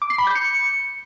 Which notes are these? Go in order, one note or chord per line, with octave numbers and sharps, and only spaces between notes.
D6
C7
B5
G6
C#7